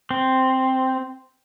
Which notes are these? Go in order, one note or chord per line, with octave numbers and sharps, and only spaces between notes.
C4